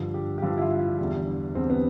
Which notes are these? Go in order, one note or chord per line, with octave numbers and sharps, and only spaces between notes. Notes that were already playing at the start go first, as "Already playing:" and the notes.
Already playing: G2 D3 F3
G4
G4
G2 D3 F3 F4
E4
F4
E4
E2 D3 G3
E2 D3 G3 C4
B3